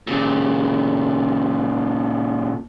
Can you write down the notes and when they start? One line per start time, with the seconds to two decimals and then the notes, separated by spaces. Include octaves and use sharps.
0.07 A#2 C#3